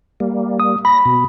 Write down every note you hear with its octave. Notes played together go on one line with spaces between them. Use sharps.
G3 A#3
D#6
B5 A#6
B2